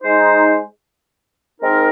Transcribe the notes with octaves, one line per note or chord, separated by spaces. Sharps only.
G#3 D#4 C5
G#3 C4 D#4 A#4